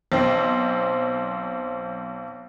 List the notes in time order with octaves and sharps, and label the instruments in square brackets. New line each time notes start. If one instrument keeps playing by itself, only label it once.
[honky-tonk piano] B1 C4